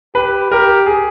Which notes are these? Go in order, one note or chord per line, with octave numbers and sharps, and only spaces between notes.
G4 B4
G4 A#4
G#4